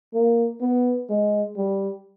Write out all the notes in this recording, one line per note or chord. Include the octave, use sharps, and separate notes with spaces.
A#3
B3
G#3
G3